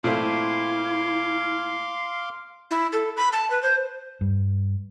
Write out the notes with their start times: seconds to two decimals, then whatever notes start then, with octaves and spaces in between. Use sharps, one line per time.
0.04 A#2 A3 C4 E4 F5 C6 D6
2.71 E4
2.93 A4
3.17 B5
3.33 A5
3.50 B4
3.63 C5
4.21 G2